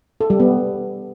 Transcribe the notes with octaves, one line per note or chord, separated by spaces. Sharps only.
A4
G3
B3